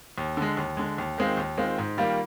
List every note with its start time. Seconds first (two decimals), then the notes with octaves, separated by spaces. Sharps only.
0.18 D#2
0.37 D3
0.42 G#3
0.57 D#2
0.77 D3 G#3
0.98 D#2
1.18 D#3 G#3 C4 F4
1.37 D#2
1.58 D#3 G#3 C4 F4
1.78 G#2
1.97 D#3 G3 A#3 F4